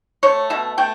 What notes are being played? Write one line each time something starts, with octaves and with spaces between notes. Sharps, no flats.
A3 C#5
B2 E5
A3 G5